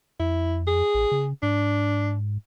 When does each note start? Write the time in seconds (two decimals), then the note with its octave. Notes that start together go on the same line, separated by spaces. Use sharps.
0.20 F2 E4
0.67 G#4
0.94 A1
1.12 C#3
1.43 G#2 D4